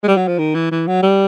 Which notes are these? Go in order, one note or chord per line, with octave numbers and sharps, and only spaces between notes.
G#3
G3
F#3
F3
D#3
E3
E3
F#3
G3